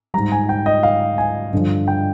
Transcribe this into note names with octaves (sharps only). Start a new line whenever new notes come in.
G#2 G3 A#5
G#5
G5
D#5
F5
G#5
G2 D3 F3
G5